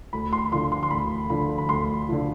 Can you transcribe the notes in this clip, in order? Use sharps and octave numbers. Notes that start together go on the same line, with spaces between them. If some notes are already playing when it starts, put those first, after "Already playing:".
D2 B5
C6
D3 F3 C6
C6
C6
D2 B5
D3 F3 B5
B5
D2 C6
D3 F3